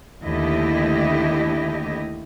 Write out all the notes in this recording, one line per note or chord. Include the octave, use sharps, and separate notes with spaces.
D#2 D3 A3 E4 G4 D#5